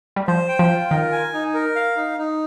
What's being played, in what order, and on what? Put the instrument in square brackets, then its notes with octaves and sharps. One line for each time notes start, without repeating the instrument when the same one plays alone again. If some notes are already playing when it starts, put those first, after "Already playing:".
[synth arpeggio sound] G3
[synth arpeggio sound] F3 [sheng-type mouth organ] C5
[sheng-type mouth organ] G5
[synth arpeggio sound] F3
[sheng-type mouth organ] F4
[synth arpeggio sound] D#3 [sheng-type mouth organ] A#4
[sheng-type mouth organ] G#5
D#4
A#4
F5
D#4
D#4